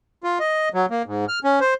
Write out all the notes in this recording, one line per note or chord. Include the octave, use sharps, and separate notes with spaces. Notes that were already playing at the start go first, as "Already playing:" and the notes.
F4
D#5
F#3
A#3
G#2
F6
C#4
C5